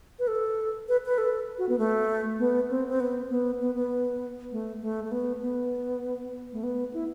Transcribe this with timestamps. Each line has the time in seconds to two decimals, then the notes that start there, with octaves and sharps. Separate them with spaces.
0.19 B4
0.28 A4
0.89 B4
1.06 B4
1.18 A4
1.58 F#4
1.69 B3
1.79 A3
2.39 B3
2.70 C4
2.88 C4
3.00 B3
3.30 B3
3.61 B3
3.75 B3
4.52 A3
4.82 A3
5.05 A3
5.12 B3
5.42 B3
6.53 A3
6.64 B3
6.93 E4